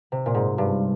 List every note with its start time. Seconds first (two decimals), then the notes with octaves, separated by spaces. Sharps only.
0.12 C3
0.26 A#2
0.34 G#2
0.58 G2